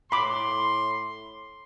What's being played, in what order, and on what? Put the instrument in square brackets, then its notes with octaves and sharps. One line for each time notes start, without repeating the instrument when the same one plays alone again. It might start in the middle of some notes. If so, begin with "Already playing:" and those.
[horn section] A2 C6 [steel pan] B5 D6